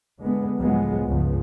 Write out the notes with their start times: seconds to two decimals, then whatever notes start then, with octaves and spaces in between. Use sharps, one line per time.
0.22 D3 G#3 B3
0.58 C#2 A2 F3 F#3 G#3 B3
1.06 C#2 G2 C#3 F3 B3